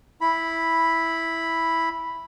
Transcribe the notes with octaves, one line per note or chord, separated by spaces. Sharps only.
E4 B5